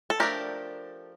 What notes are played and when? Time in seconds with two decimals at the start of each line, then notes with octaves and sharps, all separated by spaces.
0.10 A4
0.20 F3 A3 D4 G4 A#4